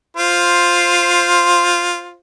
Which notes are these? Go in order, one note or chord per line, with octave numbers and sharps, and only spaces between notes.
F4 C5